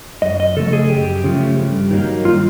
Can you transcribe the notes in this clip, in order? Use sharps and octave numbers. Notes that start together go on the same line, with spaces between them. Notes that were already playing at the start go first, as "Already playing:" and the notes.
F#2 D#5
D#5
C#3 F3 A3 A4
G#4
F#2 G4
C#3 F3 A3
G2
D#3 F#3 A#3 D#4
G2 F4